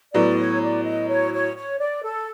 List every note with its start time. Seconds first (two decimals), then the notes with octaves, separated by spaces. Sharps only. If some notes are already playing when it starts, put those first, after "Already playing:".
0.14 A2 F#3 B3 D5
0.38 C#5
0.62 D5
0.85 D#5
1.09 C#5
1.33 C#5
1.57 C#5
1.79 D5
2.03 A4